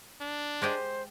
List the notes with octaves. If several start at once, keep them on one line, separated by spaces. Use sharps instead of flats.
D4
G#3 G4 C5 D#5